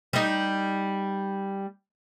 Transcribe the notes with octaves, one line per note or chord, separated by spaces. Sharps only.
G3 D#4